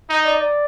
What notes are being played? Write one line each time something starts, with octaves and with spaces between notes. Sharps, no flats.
D#4 D#5
D5
D5